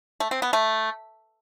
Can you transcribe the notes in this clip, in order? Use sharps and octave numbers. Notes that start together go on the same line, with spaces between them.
A3
C4
B3
A3